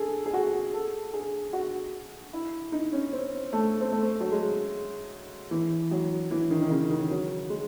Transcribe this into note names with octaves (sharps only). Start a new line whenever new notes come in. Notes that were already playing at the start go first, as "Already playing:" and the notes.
Already playing: G#4 A4
G#4
F#4
A4
G#4
F#4
E4
D#4
C#4
C4
A3
C4
A3
F#3
G#3
E3
F#3
E3
D#3
D#3
C#3
D#3
F#3
G#3